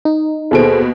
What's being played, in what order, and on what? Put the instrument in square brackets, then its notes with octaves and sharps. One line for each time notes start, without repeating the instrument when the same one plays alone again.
[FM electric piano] D#4
[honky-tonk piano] D#2 B2 D7 [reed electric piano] G#4 A4 C5